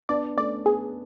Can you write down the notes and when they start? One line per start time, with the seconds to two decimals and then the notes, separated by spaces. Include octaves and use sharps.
0.09 B3 D4 D5
0.37 A3 C#4 D5
0.66 B3 G#4